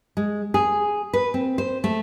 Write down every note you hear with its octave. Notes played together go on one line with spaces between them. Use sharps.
G#3
G#4
B4
C4
C5
A3